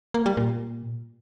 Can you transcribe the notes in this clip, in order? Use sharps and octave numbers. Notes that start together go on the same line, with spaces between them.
A#3
G3
A#2